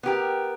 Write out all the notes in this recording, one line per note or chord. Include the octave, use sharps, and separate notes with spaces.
B3 G4 A#4